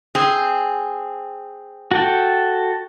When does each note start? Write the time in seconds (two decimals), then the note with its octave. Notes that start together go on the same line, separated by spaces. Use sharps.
0.15 C4 G#4
1.91 F#4 A4 G5